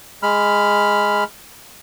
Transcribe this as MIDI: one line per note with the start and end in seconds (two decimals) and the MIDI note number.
0.23 1.24 56
0.23 1.24 83
0.23 1.24 89